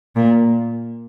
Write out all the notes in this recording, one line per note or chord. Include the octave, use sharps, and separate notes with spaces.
A#2